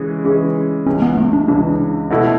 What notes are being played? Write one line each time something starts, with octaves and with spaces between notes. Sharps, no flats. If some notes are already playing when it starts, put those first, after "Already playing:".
Already playing: C#3 E3 G#3 C#4 G#4
C#3 E3 G#3 C#4 G#4
C#2 C#3 E3 C#4
B3
A3
D4
C#2 C#3 E3 D4
B2 A3 E4